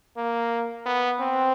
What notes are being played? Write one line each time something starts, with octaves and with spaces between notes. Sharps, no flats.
A#3
B3
C4